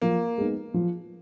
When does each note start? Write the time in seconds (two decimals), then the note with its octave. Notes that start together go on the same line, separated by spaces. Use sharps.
0.02 F3 A#3
0.38 G#3 B3 D#4
0.74 F3